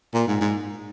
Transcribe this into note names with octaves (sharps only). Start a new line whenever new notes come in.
A#2
G#2
G#2